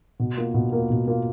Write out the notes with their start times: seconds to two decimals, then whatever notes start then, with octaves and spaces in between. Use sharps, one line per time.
0.19 B2
0.37 A#3 F4
0.54 B2
0.72 A#3 F4
0.90 B2
1.07 A#3 F4